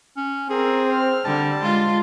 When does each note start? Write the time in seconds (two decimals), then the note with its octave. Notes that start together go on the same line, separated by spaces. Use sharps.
0.17 C#4
0.50 C4 G#4 A#4
0.88 C5 F6
1.25 D3 G3 A5
1.62 G#3 F4 F5 C6